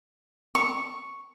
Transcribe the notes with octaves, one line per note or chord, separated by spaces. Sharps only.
C#6